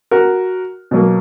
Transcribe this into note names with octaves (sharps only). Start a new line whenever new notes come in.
F#4 A#4
B2 F#3 A#3